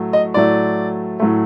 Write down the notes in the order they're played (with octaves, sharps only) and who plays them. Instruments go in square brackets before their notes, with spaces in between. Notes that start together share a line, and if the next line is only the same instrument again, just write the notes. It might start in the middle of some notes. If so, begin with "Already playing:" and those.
Already playing: [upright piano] A2 F#3 A3
D#5
A2 F#3 A3 D5
A2 F#3 A3